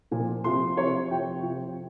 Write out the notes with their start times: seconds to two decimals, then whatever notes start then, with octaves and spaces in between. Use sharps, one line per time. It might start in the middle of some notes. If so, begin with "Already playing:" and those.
0.11 A#2 F3
0.44 C3 F3 C6
0.77 C3 F3 C#5
1.11 C3 F3 G5
1.43 C3 F3